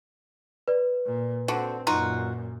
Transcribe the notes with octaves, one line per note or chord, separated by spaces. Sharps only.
B4 D5
A#2
D3 C4 F#4
F#2 A#2 D#4 F4 F#4